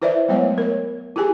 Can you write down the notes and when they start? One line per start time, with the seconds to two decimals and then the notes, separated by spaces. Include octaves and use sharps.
0.02 E4 B4 C5 D5 E5
0.29 F#3 G#3 A3 B3 C#5 E5
0.58 A#4 C#5
1.16 E4 G4 G#4 G#5